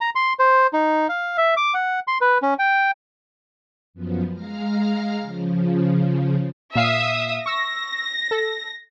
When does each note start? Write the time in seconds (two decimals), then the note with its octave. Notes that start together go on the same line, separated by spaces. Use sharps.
0.01 A#5
0.15 C6
0.39 C5
0.73 D#4
1.09 F5
1.38 E5
1.57 D6
1.74 F#5
2.07 C6
2.21 B4
2.42 C#4
2.59 G5
3.94 F#2 F3 B3
4.32 G#3 F5 A#5 F6
5.20 C#3 F3
6.75 A#2 E5 F5 D#6 C7
7.46 C#6 E6 A#6
8.31 A4